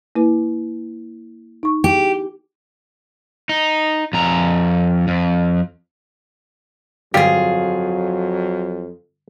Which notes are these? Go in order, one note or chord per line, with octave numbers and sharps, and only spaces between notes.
A#3 E4 B4
D#4 C#6
G4
D#4
F2 A#5
F2
G1 F2 F#3 G3 F4 G4 G#4